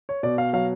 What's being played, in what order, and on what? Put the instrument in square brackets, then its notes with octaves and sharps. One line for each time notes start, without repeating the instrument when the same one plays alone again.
[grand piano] C#5
B2 D5
F5
F#3 F5